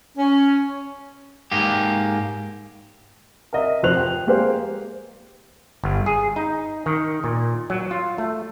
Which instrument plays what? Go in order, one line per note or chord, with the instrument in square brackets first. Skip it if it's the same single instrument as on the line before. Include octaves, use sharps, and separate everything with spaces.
[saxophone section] C#4
[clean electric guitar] G#2 A#3 G4
[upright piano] A#4 D#5 E5
F1 F3 C5 F#6 F7
G5
G#3 A#3 G4 A#4 C5 F5
[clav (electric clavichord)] G1
G#4
D#4
D#3
A#2
F#3
F4
A3